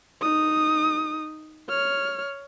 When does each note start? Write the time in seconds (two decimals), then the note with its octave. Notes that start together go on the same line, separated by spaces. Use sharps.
0.21 D#4 D#6
1.69 C#5 F6